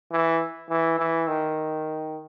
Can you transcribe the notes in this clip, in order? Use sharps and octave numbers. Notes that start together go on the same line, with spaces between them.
E3
E3
E3
D#3